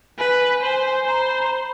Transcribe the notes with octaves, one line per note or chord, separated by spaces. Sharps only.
B4 G#5
C5
C5 A#5
B5
A#5
B5